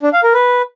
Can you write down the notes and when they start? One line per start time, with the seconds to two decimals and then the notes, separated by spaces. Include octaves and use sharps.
0.03 D4
0.13 F5
0.23 A#4
0.34 B4